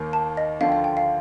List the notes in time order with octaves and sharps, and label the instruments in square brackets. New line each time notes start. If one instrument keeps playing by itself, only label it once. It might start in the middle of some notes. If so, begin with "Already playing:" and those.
Already playing: [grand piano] D#2 D#3 A#3
[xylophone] A5
D#5
[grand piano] D2 D3 F3 [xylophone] F5
[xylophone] G5
F5
G5
F5